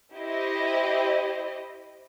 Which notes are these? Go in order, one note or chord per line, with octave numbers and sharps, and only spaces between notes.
E4 G4 C5 D#5